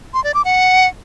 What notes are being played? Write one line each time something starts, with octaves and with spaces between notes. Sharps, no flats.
C6
D5
D6
F#5